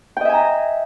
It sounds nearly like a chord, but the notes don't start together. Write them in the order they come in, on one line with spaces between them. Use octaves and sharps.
G5 D#5 E5 G#5 A#5